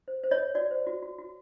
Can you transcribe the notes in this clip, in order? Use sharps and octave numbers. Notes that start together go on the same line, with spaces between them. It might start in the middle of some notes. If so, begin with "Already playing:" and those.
C5
C5
C#5 D#5
A4
F#4 D5
C5
F#4
F#4
F#4